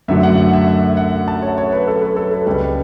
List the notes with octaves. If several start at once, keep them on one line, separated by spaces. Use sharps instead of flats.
F#2 D3 F#3 A3 E5
F#5
F#5
E5
E5
F#5
A5
C#5
C#5
B4
A4
B4
A4
B4
C#2 C#3 G3 B4